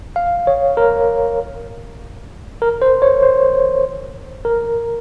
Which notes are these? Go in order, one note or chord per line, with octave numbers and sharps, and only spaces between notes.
F5
C#5
A#4
A#4
C5
C#5
C5
A#4